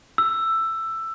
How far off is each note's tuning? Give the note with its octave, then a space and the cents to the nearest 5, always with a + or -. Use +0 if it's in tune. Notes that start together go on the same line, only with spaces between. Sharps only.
E6 +10